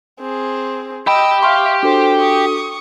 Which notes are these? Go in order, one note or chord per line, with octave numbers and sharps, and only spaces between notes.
C4 G#4
G4 D#5 G5 B5 E6
E5 F5 C6 C#6 F6
D4 F#4 A4 C5
C#6 D#6